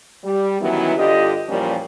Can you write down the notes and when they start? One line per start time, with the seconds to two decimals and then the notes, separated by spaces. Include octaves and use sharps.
0.24 G3
0.61 D#3 E3 F#3 B3 C#4 E4
0.97 G2 D3 F4 G4 D#5
1.48 E2 A#2 F3 G3 A#3 C#4